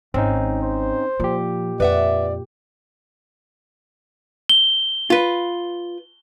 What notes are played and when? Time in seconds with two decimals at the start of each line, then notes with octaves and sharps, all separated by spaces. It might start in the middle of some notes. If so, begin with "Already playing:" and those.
0.14 G#1 C4 C#4 D#4
0.62 C5
1.20 A#2 F3 G4
1.80 F2 B4 D5 E5 F#5
4.49 G7
5.10 F4 B4